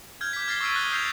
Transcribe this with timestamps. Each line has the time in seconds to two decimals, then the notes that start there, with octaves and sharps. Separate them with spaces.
0.21 F6 G6 G#6
0.33 D6 B6
0.48 F6 A6 A#6 C7 G7
0.60 C#6 D#6 E6 B6 D7 D#7
0.74 D#6 F#6 A#6 C7 G7
0.92 D#6 G6 G#6 B6 C7 F7